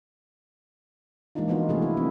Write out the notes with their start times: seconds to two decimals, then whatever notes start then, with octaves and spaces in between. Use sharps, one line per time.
1.35 E3 G#3 A#3 D4 D#4 F4
1.48 F3 G#3 B3 D#4 F4 F#4
1.69 C3 A3 B3 D4 E4 G#4
1.82 F3 E4
1.97 A#3 C4 D4